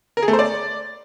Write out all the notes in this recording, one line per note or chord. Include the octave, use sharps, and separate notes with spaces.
A#4
G#4
A3
C5
D5